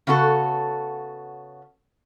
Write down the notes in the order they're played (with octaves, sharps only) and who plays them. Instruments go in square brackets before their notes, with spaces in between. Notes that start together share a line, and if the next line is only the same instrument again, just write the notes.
[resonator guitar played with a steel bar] C#3 B3 F#4 A4